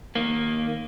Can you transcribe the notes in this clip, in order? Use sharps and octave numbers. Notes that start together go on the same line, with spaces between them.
D#3 A#3